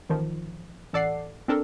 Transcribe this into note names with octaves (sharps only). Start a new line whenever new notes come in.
A1 D#3 F3
A1 A4 D5 F#5 C7
C4 D4 A4 A#4